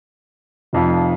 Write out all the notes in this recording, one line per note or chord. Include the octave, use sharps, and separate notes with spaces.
F1 F2 F3